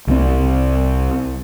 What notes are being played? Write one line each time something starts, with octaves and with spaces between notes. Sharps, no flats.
C2 G3 C4